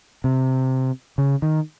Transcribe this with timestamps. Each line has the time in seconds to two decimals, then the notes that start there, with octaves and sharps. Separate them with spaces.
0.24 C3
1.18 C#3
1.42 D#3